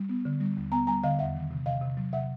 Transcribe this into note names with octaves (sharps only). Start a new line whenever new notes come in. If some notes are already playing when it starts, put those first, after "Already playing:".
Already playing: G3
B3
D3
G3
D#2
B3 G#5 A#5
G3 G#5 A#5
D3 D#5 F5
E2 E5 F#5
D#3
C3
C3 D#5 F5
C3
F#3
C3 E5 F#5